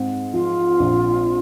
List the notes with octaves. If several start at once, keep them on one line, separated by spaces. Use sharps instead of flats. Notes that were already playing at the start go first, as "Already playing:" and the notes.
Already playing: G#2 C4
F3 F4
A#1